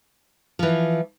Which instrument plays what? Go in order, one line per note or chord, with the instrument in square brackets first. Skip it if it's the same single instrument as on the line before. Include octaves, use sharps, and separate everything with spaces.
[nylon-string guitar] E3 F3